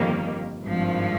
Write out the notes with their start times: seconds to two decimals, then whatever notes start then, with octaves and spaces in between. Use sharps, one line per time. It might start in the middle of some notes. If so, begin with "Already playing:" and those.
Already playing: G1 F2 D#3 G3 A#3
0.63 G#1 G2 F3